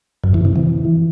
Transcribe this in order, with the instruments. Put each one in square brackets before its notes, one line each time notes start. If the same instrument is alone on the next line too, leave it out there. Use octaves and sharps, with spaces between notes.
[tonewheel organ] F#2
E3
C3
E3